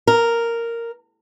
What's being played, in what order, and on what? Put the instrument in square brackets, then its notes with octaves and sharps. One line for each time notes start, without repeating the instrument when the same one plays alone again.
[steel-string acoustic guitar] A#4